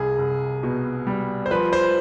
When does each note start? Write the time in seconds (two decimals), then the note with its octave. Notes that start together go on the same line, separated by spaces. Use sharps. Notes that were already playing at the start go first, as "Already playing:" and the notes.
Already playing: C2 G#4
0.19 C2
0.63 B2
1.07 G3
1.46 C5
1.51 F3 B4
1.73 C5